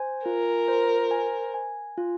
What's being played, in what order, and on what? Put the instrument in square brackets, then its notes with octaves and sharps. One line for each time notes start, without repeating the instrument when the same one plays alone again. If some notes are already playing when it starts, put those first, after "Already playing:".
Already playing: [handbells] C5 G#5
[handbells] F4 [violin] A#4
[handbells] C5
G#5
G#5
F4